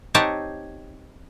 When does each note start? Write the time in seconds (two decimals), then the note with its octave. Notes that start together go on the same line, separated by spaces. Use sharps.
0.14 C4 D#4 G4 C#5 F#5 A5